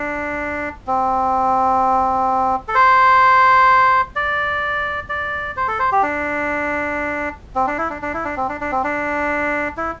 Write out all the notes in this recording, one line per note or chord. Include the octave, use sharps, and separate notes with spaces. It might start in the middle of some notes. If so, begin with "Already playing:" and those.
Already playing: D4
C4
A4
C5
D5
D5
C5
A4
C5
G4
D4
C4
D4
E4
D4
D4
E4
D4
C4
D4
D4
C4
D4
E4